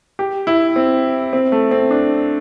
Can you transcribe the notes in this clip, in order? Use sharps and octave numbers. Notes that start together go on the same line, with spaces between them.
G4
E4
C4
C4
A3
C4
D4